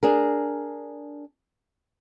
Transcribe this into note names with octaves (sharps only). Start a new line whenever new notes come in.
D4 G#4 A#4